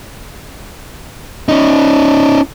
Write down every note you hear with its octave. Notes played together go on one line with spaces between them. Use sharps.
C#4 D#4